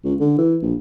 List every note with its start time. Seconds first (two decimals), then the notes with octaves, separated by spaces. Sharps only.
0.04 C#2
0.20 D3
0.38 E3
0.62 A#1